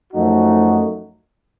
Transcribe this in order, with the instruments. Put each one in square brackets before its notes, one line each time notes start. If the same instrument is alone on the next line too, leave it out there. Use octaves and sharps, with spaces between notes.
[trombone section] F#2 F3 A3 D#4 F#4